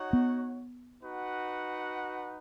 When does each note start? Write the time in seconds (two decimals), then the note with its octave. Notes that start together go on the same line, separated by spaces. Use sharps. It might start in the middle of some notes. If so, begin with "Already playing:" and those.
Already playing: D#4 F#4 C#5 F#5
0.13 B3
1.01 D#4 F#4 B4 F#5